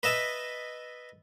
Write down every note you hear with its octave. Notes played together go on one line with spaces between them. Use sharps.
B4 D#5 E5 A5